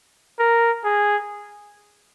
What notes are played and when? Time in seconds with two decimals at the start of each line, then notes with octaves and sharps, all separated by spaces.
0.39 A#4
0.84 G#4